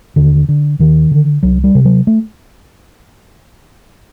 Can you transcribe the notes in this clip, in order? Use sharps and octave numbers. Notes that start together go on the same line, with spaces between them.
D#2 D3
D3
D#2 D#3
D3
C2 F#3
G3
C3
F#3
A3